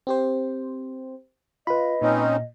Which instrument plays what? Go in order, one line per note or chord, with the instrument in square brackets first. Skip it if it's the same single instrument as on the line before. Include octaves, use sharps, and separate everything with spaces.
[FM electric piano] C4 G4 C5
[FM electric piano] F4 [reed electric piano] B4 B5 [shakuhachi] D#5
[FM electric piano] A#2 [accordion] C4 C#4 D#4